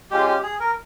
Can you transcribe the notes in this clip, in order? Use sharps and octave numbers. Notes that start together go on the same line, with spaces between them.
G#3 C#4 F4 G4
G4
G#4
A#4